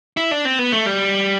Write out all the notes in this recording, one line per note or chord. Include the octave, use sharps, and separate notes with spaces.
E4
D4
C4
B3
A3
G3